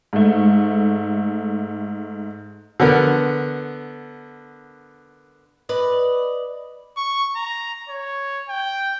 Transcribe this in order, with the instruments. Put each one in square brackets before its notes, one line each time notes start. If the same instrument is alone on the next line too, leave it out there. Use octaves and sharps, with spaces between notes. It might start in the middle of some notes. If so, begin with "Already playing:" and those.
[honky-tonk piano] G#2 A3
[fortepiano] D3 B3 A#4
[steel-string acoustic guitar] B4 D5 D#5
[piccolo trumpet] C#6
A#5
C#5
G5